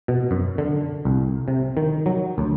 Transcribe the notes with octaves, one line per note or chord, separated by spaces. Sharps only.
B2
F#2
D3
C2
C3
D#3
F#3
D2